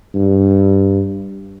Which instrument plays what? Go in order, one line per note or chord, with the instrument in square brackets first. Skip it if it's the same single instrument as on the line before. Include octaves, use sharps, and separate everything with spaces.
[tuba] G2